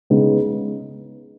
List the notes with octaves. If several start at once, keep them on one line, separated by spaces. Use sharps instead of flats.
C#3 G#3 B3 D#4 G#4